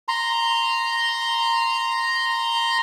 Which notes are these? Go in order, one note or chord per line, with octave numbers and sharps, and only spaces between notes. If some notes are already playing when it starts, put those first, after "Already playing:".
A#5 C6